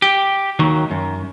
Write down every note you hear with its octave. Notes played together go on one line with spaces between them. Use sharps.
G4
D#2 D#3 F#3
F#2